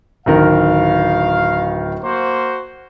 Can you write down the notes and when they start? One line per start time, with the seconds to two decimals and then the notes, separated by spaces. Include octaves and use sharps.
0.26 D1 D#3 A#4 F5
2.03 A#3 F#4 C5